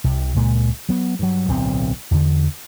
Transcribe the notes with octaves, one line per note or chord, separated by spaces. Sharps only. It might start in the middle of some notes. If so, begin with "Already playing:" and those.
C2 C3
C#2 A#2 G#3
F#3 B3
G2 F#3
D1 B1 C4
E2 D3